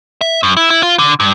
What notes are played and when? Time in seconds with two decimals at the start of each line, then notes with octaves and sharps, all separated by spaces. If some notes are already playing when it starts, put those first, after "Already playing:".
0.21 E5
0.43 F#2
0.57 E4
0.70 E4
0.83 F4
0.99 D3
1.20 G2